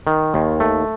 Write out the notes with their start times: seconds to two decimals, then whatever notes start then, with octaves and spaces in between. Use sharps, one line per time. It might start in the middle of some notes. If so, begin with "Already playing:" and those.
0.07 D#3
0.34 D#2
0.60 A3